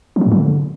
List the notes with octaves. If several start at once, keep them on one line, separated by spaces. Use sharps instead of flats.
F3
F#3
F#2
F#3
D3